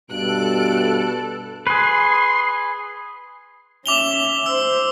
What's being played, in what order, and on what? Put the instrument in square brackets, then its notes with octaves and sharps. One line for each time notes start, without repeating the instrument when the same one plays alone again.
[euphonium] G2 [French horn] B2 [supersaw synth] A4 [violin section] F#6 D7
[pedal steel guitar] G#4 B4 [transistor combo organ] C6
[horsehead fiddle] C#4 E5 [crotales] D6 F7 G7
[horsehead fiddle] C5 [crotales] E6